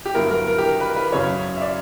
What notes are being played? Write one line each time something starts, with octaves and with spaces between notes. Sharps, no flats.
G4
G2 D3 F#3 B3 E4 A#4
A#4
A#4
G4
A#4
B4
B4
F#2 C#3 F#3 C#4 C#5
E5
D5